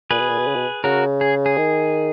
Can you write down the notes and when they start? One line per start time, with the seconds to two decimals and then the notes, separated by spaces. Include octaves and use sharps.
0.11 A#2 G#4 B4
0.20 B2
0.29 A#2
0.38 B2
0.47 C#3
0.56 B2
0.84 C#3 F#4 A#4
1.21 G#4
1.46 G#4
1.58 D#3